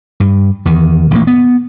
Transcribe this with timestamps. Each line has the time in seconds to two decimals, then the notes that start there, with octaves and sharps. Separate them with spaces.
0.20 G2
0.65 E2 D#3
1.11 A1 A#2 A#3
1.27 B3